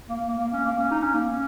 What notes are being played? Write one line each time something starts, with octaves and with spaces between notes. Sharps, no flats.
A#3
A#3
A#3
C#4
A#3
C#4
D#4
C#4
A#3
C#4